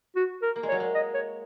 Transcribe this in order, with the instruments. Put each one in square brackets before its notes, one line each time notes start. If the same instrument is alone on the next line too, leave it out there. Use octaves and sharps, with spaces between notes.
[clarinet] F#4
A#4
[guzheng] A#3
G#3
[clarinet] C#5
[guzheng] F#3
G#3
[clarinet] D#5
C#5